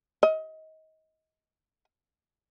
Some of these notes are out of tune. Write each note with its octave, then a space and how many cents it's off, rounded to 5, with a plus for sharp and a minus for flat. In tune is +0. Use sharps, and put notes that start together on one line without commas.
D#5 +25